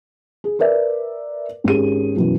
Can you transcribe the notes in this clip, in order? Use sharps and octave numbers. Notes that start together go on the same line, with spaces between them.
G#4
A#4 B4 D5 E5
G#1 C#4 G4 G#4 D#7
F#2 B2 E3